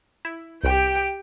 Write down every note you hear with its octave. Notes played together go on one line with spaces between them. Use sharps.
E4
C2 G4 G5